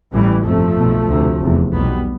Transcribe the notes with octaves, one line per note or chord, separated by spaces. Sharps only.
A1 A2 E3 G3
G1 F2 C3 F3 A3
B1 B2
D2 C3
F1 E2 C3
B1 B2 G3 B3